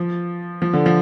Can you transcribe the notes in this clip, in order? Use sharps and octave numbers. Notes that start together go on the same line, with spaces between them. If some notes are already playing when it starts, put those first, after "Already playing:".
Already playing: F3
F3
D3
F3